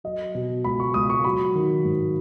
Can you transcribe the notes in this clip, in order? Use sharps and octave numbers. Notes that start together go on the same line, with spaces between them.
F#3 D#5
B2
C#2 B5
C#6
C#2 D#6
C#6
F#3 B5
D#3
G#2